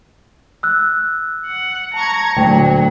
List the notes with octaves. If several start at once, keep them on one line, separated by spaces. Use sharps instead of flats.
E6 F#6
F#5
A5 A#5 C#6 G#6
D2 A#2 F#3 G5